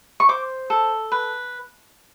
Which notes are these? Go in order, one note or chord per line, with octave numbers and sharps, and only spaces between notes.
C#6
C5 D6
A4
B4